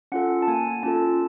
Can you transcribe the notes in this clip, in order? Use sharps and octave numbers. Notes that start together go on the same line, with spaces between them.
C#4 F4 A4 F#5
A5
A#3 G#5
C#4 F4 A4 A5